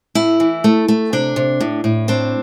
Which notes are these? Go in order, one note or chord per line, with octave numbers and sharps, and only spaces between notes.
A2 E4
E3
A3
A3
C3 D4
C3
A2
A2
C4 D4